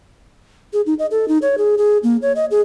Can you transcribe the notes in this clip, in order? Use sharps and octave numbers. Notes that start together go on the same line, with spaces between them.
G#4
D#4
D#5
A4
D#4
C#5
G#4
G#4
A#3
C#5
D#5
G#4